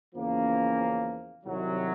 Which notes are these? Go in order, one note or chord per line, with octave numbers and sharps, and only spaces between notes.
E2 C#3 F3 A#3 C#4
C2 C3 D#3 F#3